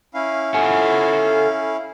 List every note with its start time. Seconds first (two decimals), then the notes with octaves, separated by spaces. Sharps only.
0.14 C#4 E4 F5
0.54 A4 F#5 G#5